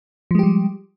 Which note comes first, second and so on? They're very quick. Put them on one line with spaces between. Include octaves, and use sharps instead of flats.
F3 G#3 G4 G3